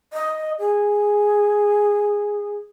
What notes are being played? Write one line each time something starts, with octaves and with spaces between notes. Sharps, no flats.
D#5
G#4